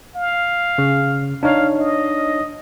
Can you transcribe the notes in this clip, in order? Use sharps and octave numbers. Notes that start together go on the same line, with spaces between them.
F5
C#3
D4 D#4 C#5 F5
D#5